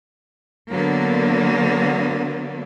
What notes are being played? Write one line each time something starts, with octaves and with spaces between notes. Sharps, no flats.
D3 F#3 A#3 B3